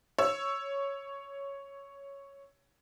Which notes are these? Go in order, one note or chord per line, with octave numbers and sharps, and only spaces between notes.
C#5 E6